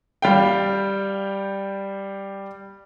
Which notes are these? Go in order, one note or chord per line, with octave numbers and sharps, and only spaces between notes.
G3 F5 G5